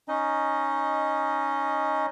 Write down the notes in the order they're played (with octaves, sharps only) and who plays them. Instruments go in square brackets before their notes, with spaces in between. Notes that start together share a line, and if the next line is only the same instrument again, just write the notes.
[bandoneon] C#4 D#4 D#5